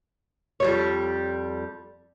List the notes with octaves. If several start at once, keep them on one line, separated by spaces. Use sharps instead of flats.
F2 G3 C#5